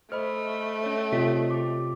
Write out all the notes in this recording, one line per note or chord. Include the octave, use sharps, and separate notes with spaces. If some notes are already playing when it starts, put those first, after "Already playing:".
A3 C5 D#5 B5 F6
C#4 C#5
C3 F4 C#5 D#5 B6
G4 D6